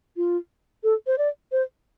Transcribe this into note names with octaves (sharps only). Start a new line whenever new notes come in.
F4
A4
C5
D5
C5